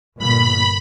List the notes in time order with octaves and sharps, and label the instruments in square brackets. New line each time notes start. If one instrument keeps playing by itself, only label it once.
[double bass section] G1 A#2 [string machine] B5